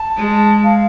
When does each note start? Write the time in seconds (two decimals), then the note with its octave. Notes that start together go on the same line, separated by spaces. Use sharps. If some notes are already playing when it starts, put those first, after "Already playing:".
Already playing: A5
0.17 G#3
0.64 F5